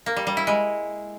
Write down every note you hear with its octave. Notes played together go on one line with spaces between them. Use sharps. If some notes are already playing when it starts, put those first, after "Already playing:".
A#3
G3
G3
E4
G#3